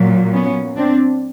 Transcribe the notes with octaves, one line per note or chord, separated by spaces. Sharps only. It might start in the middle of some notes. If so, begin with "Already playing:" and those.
Already playing: A#2 F#3
B3 C#4
C4 D4